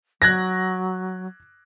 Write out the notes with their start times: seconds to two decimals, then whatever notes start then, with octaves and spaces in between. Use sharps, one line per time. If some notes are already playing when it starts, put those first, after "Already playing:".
0.22 F#3 F#6 G#6 A#6